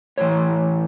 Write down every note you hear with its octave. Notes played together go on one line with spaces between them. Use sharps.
A2 E3 C#5